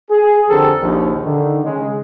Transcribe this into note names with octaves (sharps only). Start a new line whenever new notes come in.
G#4
F2 D3 C4 G4 A4 A#4
A#1 D#2
D3 D#3
C#3 G#3